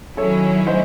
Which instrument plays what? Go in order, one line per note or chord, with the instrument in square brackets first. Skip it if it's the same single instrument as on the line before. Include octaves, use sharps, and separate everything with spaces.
[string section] D#3 F#3 C#4 E4 [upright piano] A4 C#5
[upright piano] C5 D#5